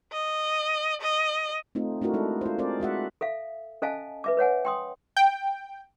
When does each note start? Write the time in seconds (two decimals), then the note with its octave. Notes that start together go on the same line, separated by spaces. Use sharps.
0.13 D#5
1.02 D#5
1.75 A3 C4 D#4 F4
2.02 A3 D4 E4 F#4 A#4
2.14 G#3 D#4 A4
2.41 F4 C5
2.58 C4 G#4 A#4 C5 D5
2.80 G#3 F#4 E5 F#5
3.21 A4 E5 F5
3.82 C#4 A4 D#5 F5 G#5 A5
4.24 B4 E5 D6
4.37 B4 C#5 F#5 G#5
4.65 G5 C6 D#6
5.17 G5